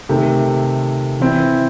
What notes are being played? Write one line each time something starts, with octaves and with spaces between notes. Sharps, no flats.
C3 D#3 A3
E3 C4 E4